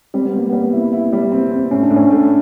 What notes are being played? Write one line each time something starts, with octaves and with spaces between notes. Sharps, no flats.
G3 C4
B3
G3 A#3
G3 B3
E4
E4
G3
C4
C4
A2 C#4
D4
A2
C#4
A3